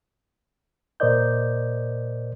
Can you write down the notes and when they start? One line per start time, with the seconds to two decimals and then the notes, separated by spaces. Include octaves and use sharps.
1.00 A#2 A#4 C5 D5 D#5 G6